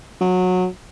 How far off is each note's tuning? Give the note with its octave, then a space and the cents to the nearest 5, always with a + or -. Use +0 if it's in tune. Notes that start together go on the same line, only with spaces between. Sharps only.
F#3 -20